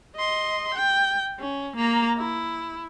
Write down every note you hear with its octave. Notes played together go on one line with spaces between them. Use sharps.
D#5 C6
G5
C#4
A#3 A#5
E4